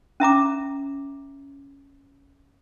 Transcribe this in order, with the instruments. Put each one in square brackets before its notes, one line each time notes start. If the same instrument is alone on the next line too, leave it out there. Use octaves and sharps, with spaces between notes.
[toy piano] C#4 E5 A#5 D6